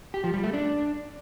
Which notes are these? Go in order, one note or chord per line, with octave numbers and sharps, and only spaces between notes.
G4
F3
G3
A3
D4